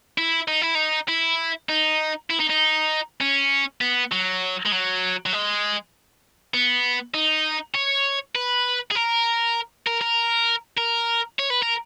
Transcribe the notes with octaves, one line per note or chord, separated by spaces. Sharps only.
E4
D#4
E4
D#4
E4
D#4
E4
D#4
D#4
C#4
B3
F#3
G#3
F#3
F#3
G#3
B3
D#4
C#5
B4
G#4
A#4
A#4
A#4
A#4
C#5
B4
A#4